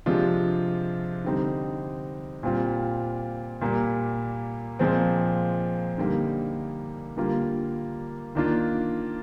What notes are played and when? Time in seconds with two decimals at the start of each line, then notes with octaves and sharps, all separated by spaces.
0.06 C3 F3 G#3 D4 F4
1.25 D3 G3 C4 D#4
2.43 A#2 G3 C4 F4
3.61 A#2 G3 A#3
4.79 A#2 F3 G#3 C4
5.98 D3 G3 A#3 D#4
7.17 D3 G3 A#3 F4
8.35 D#3 A#3 D4 F4